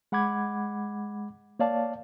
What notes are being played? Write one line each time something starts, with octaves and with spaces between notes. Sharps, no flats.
G#3 F#5 B5 D6 G#6
A#3 C#5 D5 F5 A5